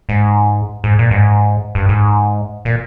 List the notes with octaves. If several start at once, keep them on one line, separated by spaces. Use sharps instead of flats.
G#2
G#2
A#2
G2
G#2
G2
G#2
A#2